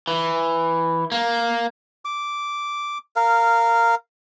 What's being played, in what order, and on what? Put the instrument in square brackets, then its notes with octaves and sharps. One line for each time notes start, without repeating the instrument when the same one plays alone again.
[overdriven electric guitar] E3
A#3
[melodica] D6
A#4 F5